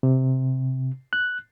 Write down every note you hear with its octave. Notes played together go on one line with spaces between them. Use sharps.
C3
F#6